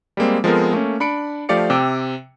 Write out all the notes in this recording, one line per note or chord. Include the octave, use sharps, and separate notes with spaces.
G3 G#3 A#3 C4
F3 G#3 B3 C4 A4 A#4
A3 A#3 C#4
D4 B5 C#7 D7
F3 A3 G4 D5 F5 C#7
C3 G5 D6 E6